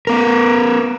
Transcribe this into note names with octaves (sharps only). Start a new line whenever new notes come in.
B3 A#4